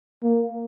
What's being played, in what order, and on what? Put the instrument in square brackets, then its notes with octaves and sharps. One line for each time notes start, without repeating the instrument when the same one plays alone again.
[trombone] A#3